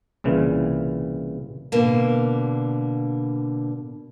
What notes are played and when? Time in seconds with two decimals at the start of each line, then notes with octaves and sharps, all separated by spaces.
0.24 C2 A#2 C#3 E3
1.72 B2 D3 A#3